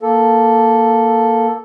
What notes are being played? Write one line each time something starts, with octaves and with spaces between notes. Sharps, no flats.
A#3 A4